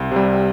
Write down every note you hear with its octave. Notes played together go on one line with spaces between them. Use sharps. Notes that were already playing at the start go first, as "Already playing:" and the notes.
Already playing: C2
C3 G3